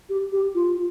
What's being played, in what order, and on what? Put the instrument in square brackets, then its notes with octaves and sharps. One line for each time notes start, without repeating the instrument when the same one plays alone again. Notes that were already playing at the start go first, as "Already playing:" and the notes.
[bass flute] G4
G4
F4